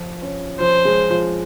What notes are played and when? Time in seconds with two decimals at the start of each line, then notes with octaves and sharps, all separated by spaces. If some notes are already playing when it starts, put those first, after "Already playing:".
Already playing: F3 F4
0.22 C#4
0.60 F3 F4 C5
0.85 G#3 G#4
1.10 F3 F4